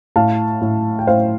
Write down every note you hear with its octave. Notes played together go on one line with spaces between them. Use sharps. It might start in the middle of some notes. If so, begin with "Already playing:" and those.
A2 F5 A5
A2
G5
A2 C5 F5